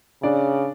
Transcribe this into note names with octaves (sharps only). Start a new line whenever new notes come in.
C#3 D4 D5